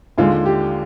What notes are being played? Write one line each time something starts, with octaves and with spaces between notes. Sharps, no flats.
D#2 D3 G#3 F4
G4